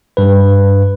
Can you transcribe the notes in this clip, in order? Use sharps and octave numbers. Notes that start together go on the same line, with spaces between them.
G2 B4